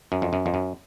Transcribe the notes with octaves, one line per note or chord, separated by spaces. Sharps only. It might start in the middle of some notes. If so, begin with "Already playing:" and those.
F#2
F2
F#2
F2
F#2